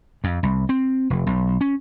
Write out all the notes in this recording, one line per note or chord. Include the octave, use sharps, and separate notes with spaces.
F2
C2
C4
F1
B1
C#4